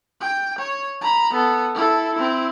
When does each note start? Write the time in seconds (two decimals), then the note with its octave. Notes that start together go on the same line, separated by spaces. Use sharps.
0.20 G5
0.58 C#5
1.01 A#5 B5
1.33 B3 A4
1.74 E4 A4
2.14 C4 E4